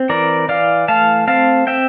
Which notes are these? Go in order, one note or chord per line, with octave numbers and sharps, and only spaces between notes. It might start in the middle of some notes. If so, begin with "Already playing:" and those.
Already playing: C4
E3 A#4 D5
E3 D5 F5
A3 F5 A5
C4 F5 A5
C4 E5 G5